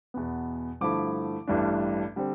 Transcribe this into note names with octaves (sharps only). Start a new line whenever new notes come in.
E2 B2 B3
G2 D3 F3 A3 E4 D6
A1 G2 E3 G3 D4
D3 G3 C4